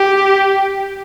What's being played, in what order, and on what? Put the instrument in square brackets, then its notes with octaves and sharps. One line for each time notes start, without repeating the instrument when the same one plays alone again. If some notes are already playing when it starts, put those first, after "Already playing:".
Already playing: [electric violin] G4